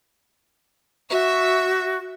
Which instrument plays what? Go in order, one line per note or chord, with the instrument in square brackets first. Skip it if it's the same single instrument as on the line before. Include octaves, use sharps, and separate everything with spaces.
[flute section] F#4 C#6 [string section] E5